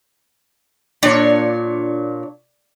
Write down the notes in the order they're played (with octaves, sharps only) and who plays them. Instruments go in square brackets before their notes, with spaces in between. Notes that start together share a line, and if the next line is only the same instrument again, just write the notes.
[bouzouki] A#2 [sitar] D4 C#5